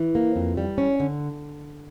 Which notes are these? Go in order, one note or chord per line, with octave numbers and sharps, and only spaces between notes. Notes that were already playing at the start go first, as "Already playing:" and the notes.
Already playing: E3
A#3
F2
G3
C#4
D3